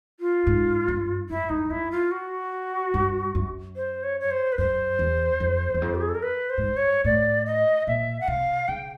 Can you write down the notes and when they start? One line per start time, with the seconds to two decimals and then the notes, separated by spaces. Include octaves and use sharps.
0.20 F4
0.47 G#2
0.88 G2
1.29 F#2 E4
1.49 G2 D#4
1.70 F#2 E4
1.91 F4
2.11 F#4
2.94 G2
3.35 F#2
3.76 C5
4.03 C#5
4.20 C#5
4.31 C5
4.52 B4
4.58 F#2 C5
4.99 E2
5.40 F2
5.74 E2
5.82 F2
5.95 G4
6.01 G#4
6.09 A4
6.15 A#4
6.23 B4
6.50 C5
6.58 G#2
6.63 G2
6.77 C#5
7.04 A2 D5
7.46 D#5
7.87 A#2 E5
8.20 F#5
8.28 C3 F5
8.68 C#3 G5